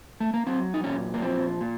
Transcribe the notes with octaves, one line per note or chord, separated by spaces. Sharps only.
A3
A#3
F#3 C4
D#4
A#2 C#4
A#3
F3 C4
A#2